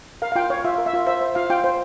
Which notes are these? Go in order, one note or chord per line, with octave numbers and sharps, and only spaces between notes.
A#4 F5
F5
F4 G5
C#5 F5
F4 E5
A#4
E5
F4
C5 E5
C5
F4 F5
F4 G5
C5